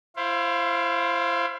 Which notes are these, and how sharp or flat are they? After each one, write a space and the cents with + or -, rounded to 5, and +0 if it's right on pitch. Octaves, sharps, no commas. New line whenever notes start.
E4 +35 C5 +15 F5 +0